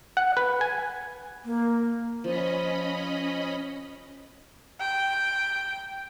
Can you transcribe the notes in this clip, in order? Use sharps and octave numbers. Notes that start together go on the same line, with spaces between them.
F#5
B4
G#5
A#3
F3 C#4 D#5 B5
G5